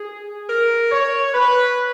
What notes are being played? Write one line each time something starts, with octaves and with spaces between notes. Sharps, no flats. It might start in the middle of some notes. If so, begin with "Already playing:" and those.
Already playing: G#4
A#4
C#5
B4